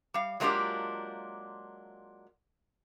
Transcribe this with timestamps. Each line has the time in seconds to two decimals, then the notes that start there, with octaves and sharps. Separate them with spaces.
0.14 G3 F5
0.40 F#3 G#3 A#3 D4 F4 G4